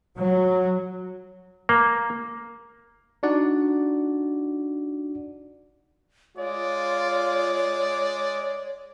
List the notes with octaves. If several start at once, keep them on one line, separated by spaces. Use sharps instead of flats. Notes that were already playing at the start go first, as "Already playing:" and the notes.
F#3
A#3
D4 D#4 F#4 D5 F#5
G#3 F4 C#5 D5